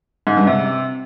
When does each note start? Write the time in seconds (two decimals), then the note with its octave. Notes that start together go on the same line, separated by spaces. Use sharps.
0.27 G#2
0.37 G2
0.47 C3